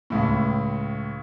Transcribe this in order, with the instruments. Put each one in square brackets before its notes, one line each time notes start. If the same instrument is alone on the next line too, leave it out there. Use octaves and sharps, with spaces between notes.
[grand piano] C#2 A2